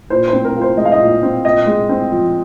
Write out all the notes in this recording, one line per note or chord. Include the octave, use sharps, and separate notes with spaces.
A#2 C5
C5
C4
A#4
F4
C5
G#3 D#5
F5
D#5
A#2
C4
A#2 D#5
G#3
C4
F3